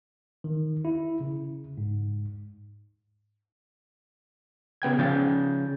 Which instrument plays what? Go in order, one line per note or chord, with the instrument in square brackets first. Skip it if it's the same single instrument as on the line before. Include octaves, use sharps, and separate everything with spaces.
[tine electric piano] D#3
E4
C#3
G#2
[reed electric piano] C#3 B3 G5 G#6
C#3 F3 G6 A6